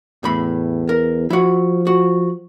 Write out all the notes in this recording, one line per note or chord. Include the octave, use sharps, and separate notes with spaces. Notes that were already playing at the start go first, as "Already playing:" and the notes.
E2 A2 B5
A#4
F3 E4 F#4
F#4